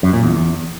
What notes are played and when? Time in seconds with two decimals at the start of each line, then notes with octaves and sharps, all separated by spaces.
0.03 F#2
0.13 A#2
0.23 E2
0.34 E2